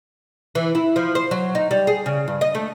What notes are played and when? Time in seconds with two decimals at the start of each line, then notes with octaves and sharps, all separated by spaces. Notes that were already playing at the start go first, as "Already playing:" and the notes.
0.55 E3
0.75 E4
0.96 F3
1.15 C5
1.31 F#3
1.55 D#4
1.71 G3
1.87 G#4
2.06 C#3
2.28 G2
2.41 D#5
2.55 A3